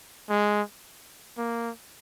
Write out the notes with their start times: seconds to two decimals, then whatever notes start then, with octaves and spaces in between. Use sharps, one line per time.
0.29 G#3
1.38 A#3